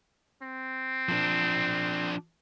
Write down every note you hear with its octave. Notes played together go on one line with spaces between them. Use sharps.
C4
F3 D4